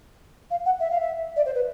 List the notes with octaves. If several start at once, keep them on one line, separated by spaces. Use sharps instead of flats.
F5
F#5
E5
F5
E5
D5
C5
B4